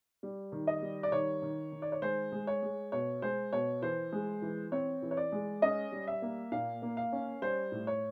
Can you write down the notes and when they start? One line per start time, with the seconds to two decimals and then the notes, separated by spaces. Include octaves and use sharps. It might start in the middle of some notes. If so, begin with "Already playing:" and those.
0.23 G3
0.52 D#3
0.67 D#5
0.82 G3
1.03 D5
1.12 D#3 C#5
1.42 D#3
1.72 D#3
1.82 D5
1.92 C#5
2.02 G#3 C5
2.32 G#3
2.47 C#5
2.62 G#3
2.92 B2 C#5
3.22 G#3 C5
3.53 B2 C#5
3.82 E3 C5
4.12 G#3
4.42 E3
4.72 C4 C#5
5.02 E3
5.11 C#5
5.17 D5
5.32 G#3
5.62 C#4 D#5
5.92 G3
6.07 E5
6.22 A#3
6.52 A#2 F5
6.82 A#3
6.97 F5
7.12 C#4
7.42 G3 C5
7.72 A2
7.87 C#5